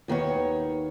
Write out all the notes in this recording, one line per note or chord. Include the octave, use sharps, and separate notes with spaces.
D#2 D#3 B3 C#5